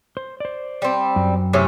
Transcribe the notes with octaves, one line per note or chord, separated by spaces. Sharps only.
C5
C5 D5
G3 C4
F#2
A2 C3 C#4